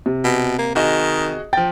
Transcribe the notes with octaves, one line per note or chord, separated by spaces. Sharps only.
C3
B2
A#3
D#3 F#4 G#4 D#5
F3 G5 A6